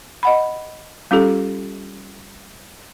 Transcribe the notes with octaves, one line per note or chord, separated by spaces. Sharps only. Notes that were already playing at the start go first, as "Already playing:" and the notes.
D#5 F#5 B5
G3 C#4 F4 G4 A4